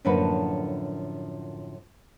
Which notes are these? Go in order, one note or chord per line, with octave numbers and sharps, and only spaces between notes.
F#2 A2 D3 F3 A#3 B4